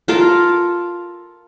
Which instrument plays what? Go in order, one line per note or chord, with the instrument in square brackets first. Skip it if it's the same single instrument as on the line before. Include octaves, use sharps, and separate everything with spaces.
[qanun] F4 A4 A#4 F5